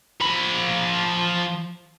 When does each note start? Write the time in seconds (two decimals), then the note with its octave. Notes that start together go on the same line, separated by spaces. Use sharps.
0.21 F3 B5